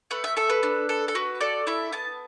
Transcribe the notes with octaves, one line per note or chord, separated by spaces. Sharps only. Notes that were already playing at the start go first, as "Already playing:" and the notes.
A3 B4
E5
A4 E5
B4
D4
A4
A4
F#4 B4
A4 D5
E4 E5
B3 A5